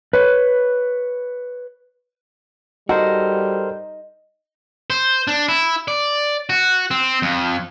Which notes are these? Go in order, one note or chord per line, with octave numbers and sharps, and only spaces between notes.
B4 C#5
G3 F#4 A4 A#4 C5 D#5
C5
D4
E4
D5
F#4
C4
F2